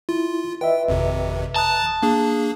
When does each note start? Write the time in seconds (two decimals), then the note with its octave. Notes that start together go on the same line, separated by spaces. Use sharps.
0.09 E4 F4
0.61 B4 D#5 E5 G5
0.88 G#1 F2 C3
1.56 A5 A#5 D#6 F#6
2.03 A#3 D4 G#4